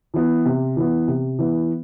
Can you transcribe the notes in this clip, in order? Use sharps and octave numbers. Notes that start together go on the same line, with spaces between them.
E3 B3
C3
E3 B3
C3
E3 B3